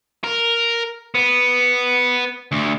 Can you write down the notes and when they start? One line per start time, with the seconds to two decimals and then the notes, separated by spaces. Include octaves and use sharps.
0.24 A#4
1.15 B3
2.52 D2